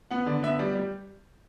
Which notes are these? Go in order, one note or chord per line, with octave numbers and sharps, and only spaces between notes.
B3 F#5
D3 D5
B3 E5
G3 D5
G3